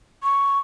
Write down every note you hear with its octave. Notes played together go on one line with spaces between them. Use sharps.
C#6